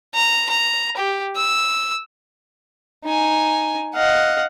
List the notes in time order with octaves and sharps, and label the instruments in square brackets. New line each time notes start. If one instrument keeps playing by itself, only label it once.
[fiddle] A#5
A#5
G4
E6
[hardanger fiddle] D#4 G#5
[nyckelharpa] D#5 F5 [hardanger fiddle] F#5